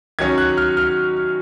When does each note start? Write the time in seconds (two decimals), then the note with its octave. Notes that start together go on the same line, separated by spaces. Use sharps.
0.19 D#3 F#3 C#4 G#6
0.38 F#6
0.57 F6
0.77 F6